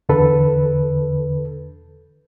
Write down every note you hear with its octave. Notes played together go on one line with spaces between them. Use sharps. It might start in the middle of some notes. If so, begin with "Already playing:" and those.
E2 D3 A4 B4